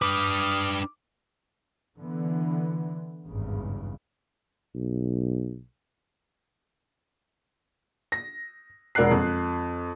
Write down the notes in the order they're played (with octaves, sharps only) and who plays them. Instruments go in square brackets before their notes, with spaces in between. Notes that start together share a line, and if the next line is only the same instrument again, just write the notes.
[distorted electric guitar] D4 B4 [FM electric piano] D6 [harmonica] D#6 F6
[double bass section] D3 E3 B3
G#1 E2 G2 C#3
[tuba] B1
[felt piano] A#6
E1 A#4 D5 F#5 F#6 C7
F2